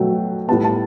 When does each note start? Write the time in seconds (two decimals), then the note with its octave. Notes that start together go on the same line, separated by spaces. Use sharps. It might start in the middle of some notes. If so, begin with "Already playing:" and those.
Already playing: B2 F#3 A3 G5
0.48 A2 G3 B3 A5
0.65 A5